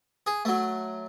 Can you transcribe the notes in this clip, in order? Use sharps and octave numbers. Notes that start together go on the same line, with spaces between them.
G#4
F#3 A3